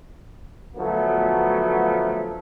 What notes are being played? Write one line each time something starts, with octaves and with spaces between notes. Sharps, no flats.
D2 F3 F#3 A3 B3